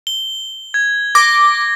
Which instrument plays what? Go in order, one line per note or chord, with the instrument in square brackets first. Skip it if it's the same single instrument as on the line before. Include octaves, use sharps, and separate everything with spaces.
[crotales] G7
G#6
[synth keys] D6 [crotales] A#6 G7